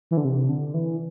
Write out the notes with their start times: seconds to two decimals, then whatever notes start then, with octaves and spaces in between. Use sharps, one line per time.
0.11 E3
0.17 D3
0.25 C3
0.49 D3
0.74 E3